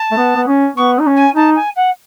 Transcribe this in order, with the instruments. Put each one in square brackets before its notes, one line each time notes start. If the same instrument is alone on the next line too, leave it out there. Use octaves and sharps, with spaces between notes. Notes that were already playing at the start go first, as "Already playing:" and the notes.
Already playing: [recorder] A5
[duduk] A3
B3
B3
C#4
[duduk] B3 [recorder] C#6
[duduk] D#4
C#4
[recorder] G#5
[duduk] D#4 [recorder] A5
[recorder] G#5
F#5